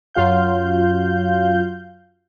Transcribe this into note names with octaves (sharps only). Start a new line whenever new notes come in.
F#2 F#3 F4 F5 G6